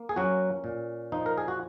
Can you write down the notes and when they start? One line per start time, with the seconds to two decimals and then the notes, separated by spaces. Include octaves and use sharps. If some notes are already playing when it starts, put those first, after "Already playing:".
Already playing: A#3
0.09 G#4
0.16 F#3 C#4 F#4
0.64 A#2
1.12 F3 D#4
1.26 A#4
1.38 G#4
1.48 F#4